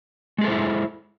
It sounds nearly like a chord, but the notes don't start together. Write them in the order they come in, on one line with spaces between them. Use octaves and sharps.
G#3 G#4 A4 C5 E4